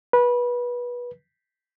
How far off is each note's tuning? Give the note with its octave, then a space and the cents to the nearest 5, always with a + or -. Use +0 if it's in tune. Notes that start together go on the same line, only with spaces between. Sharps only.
B4 -20